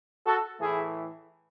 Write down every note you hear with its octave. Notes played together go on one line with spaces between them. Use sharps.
F#4 A4
A2 E3 A3 E4 G#4